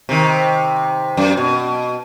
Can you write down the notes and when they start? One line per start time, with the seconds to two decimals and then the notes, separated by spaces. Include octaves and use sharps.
0.09 C3 D#3
1.17 F#2
1.37 B2